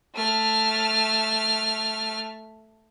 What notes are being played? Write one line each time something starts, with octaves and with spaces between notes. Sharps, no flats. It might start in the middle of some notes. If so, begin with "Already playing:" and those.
A3 F6